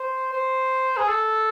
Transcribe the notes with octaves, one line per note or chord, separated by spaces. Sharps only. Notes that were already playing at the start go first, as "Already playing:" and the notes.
Already playing: C5
C5
G#4
A4